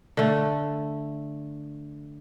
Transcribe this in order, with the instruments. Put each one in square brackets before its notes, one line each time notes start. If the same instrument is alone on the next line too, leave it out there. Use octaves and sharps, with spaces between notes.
[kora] D3 A3